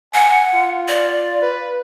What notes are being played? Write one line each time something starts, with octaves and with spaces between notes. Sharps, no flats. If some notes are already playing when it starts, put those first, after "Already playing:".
F#5 G#5
F4
D5
B4